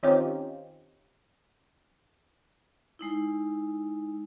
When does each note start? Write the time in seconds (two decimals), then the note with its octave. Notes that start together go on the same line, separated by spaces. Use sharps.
0.03 D#3 C4 C#4 D#4 F4 G4
2.99 G#3 D#4 E4